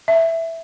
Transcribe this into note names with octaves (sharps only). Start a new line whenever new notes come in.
E5